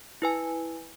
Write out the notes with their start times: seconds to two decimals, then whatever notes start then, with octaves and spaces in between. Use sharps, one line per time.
0.22 E4 B4 G#5